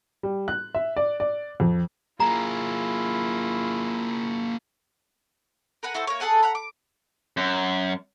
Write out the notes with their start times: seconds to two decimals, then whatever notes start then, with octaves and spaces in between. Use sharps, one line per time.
0.23 G3
0.48 F#6
0.75 E5
0.97 D5
1.20 D5
1.60 F2
2.20 A#3 E4 F4 G#4 A#5
5.83 A#4 B4 F#5 G#5
5.94 E4 F#4 A4 C5
6.07 A#3 C#5
6.20 G#4 A4 F#5 G#5
6.43 F#5 A#5 B5
6.55 D6
7.37 F#2